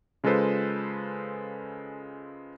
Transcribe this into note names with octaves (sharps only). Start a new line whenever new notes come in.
C#3 G#3 F4 A4 B4 C5